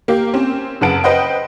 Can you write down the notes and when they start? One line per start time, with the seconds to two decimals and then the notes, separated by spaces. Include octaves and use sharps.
0.08 A#3 G4
0.34 C4 C#4
0.81 F#2 C#3 B4 F#5 A5 D7
1.04 B4 C5 D#5 F#5 G5